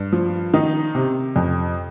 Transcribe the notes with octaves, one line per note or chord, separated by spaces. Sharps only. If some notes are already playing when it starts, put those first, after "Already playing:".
Already playing: G2
F3
D#3 D#4
C3
F2